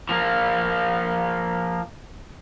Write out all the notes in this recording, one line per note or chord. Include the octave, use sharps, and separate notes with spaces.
F3 A#3